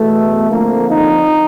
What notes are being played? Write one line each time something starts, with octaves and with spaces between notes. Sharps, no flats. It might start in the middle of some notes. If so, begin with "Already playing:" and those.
Already playing: E2 B2 A3
F2 D3 F3 A#3
D#4